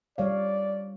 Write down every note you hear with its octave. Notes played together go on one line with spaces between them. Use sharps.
G3 C#5 D5 F5